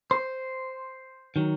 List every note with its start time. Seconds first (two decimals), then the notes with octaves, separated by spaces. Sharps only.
0.11 C5
1.36 D#3 F#3